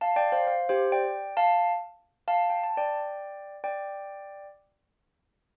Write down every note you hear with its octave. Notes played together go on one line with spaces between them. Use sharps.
F5 A5
D5 G5
C5 F5
C5 F5
G4 C5
D5 G5
F5 A5
F5 A5
G5
A5
D5 G5
D5 G5